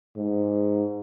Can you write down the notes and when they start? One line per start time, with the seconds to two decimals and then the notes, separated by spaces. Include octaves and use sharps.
0.16 G#2